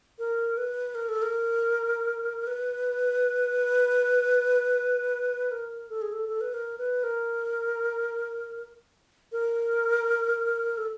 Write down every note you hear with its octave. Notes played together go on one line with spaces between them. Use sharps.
A#4
B4
A#4
A4
A#4
B4
A#4
A4
G#4
A4
A4
B4
A#4
B4
A#4
A#4
A4